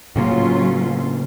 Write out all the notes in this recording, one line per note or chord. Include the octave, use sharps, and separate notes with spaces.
A2 C#3 F#3 A#3 C#4 F4